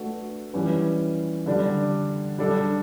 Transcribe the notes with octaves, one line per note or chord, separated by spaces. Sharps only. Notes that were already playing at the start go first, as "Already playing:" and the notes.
Already playing: A3 D4 F#4 B4
E3 G3 C#4 G4 B4
D3 G3 D4
G3 D4 A4